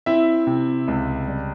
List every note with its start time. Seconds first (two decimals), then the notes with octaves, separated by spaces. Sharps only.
0.06 C4 E4 E5
0.47 C3
0.88 C#2
1.28 G3